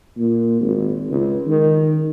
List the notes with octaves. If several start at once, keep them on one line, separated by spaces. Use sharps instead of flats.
A#2
G#1
C#2
D#3